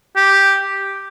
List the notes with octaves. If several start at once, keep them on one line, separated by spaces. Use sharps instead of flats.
G4